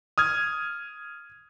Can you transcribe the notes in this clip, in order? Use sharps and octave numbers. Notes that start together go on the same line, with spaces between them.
D#6 F6 G#6